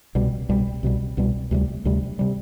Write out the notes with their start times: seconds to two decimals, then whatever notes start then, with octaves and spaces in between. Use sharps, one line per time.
0.15 C2 B2 G3
0.49 C2 B2 G3
0.83 C2 B2 G3
1.17 C2 B2 G3
1.51 D2 C3 G3
1.85 D2 C3 G3
2.19 C3 G3